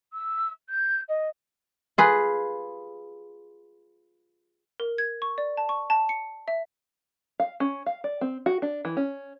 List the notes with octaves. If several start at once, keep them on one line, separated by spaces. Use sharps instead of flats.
E6
G6
D#5
F4 G#4 B4
A#4
G#6
C#6
D5
A5
C#6
A5
C#7
E5
F5
C#4
F5
D5
C4
F#4
D4
E3
C#4